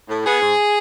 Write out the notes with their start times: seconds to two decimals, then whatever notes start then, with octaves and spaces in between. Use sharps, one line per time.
0.09 A2
0.25 B3 G#4
0.41 G#2